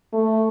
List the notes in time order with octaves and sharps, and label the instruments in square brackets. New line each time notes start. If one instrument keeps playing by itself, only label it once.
[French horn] A3